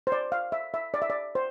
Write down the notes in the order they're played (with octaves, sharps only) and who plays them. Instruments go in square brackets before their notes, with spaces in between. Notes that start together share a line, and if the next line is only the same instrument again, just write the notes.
[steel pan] C5
D5
F5
E5
E5
D5
E5
D5
C5